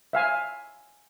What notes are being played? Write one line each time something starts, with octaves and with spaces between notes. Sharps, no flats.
E5 F5 G#5